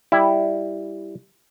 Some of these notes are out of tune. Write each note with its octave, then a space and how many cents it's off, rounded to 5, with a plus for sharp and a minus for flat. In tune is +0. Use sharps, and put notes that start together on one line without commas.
G3 +5 E4 +0